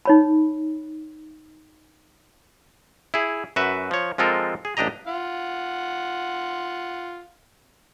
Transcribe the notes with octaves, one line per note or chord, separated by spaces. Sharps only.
D#4 C#5 B5
E4 G#4
F#2 F#4 B4 E5
F3 C#5
F3 G#3 C4 F4 A4 A#4
G#4
A1 D4 G4 D#5 A#5
F4 F#5